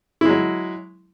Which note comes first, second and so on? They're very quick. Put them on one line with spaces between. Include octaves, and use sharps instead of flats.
E4 G#3 F#3